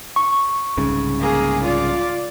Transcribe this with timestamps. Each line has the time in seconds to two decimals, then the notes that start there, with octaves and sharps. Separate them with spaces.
0.16 C#6
0.77 C2 G#2 C#3
1.20 A#3 G#4
1.63 F4 D5